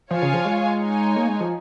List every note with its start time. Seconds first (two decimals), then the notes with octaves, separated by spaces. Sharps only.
0.11 F3 F4 C#5 F5 G#5
0.22 C#3
0.34 F3
0.45 G#3
0.81 D#4 C#5 G#5
1.16 A#3
1.28 G#3
1.40 F3